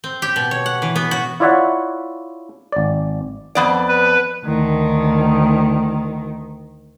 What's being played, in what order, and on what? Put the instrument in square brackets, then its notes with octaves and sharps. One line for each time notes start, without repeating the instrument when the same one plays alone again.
[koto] C4
G4
B2
C#5
F#5
E3
B3
F#4
[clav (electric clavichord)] E4 F4 C#5 D5 E5 F#5
G#1 D5
[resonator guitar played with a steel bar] F2 B3 D5
[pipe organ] B4
[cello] D2 D#3